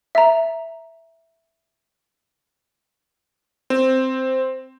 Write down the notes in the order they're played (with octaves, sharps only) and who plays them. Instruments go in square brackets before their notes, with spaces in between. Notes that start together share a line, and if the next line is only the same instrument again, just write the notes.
[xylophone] E5 A#5
[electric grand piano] C4